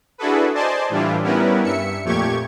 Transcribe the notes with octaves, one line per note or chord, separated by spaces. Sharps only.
D4 E4 F#4 G#4 A4 B4
C5 D5 D#5 G#5 A5 C6
A2 E3 G3 D4 E4 F4
G3 B3 C#4 E4 A#4 B4
G2 E5 C#7
F2 A#2 A3 G4 C#6 G#6